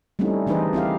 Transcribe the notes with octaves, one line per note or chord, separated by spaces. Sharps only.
G3 A3 C4 C#4 D#4 E4
E3 D4 D#4 G#4 B4 C5
C4 E4 G4 F5